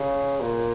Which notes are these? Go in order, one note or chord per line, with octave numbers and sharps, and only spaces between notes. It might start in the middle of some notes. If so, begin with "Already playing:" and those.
Already playing: C#3
A#2